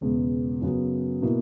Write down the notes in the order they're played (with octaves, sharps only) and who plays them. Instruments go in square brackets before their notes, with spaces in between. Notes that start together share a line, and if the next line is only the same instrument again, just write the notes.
[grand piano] E1 E2 C#3 G#3 B3
F#2 C#3 F#3 B3
B2 A#3 E4